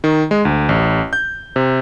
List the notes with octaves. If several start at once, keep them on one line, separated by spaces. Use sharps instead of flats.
D#3
G#3
D2
A1
G6
C3